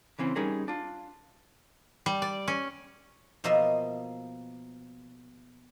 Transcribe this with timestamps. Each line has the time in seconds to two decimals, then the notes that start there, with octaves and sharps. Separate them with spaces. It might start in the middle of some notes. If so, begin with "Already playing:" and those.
0.19 C#3 E3 C4 C#4
0.36 G3 C#4 D#4 G#4 A#4
0.68 D4 F4
2.06 G3
2.22 D5
2.48 C#4
3.44 B2 F3 A#3 D#5 E5